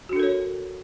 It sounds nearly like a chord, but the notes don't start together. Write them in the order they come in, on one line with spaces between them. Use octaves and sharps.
F#4 D4 A4 A#4 C#5